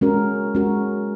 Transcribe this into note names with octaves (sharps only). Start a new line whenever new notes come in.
G#3 C#4 F#4 A#4
G#3 C#4 F#4 A#4